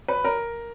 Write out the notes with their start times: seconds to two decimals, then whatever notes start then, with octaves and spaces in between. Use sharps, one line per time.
0.08 B4
0.24 A#4